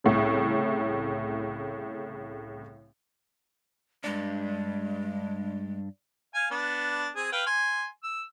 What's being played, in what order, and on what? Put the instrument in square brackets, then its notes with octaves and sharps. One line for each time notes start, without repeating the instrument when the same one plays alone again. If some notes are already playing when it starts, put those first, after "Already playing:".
[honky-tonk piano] C2 A2 C#3
[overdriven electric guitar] G2 D4 [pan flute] G#3
[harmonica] F5 G#5
B3 D4
C4 G#4 G#5
B4 F5 G5
G#5 C6
E6